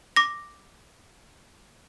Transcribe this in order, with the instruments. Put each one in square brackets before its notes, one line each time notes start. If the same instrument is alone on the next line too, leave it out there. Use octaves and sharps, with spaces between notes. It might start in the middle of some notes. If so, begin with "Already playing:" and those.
[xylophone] D6 A#6